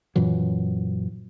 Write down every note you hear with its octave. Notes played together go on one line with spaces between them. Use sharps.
F#2 A#2 E3 F#3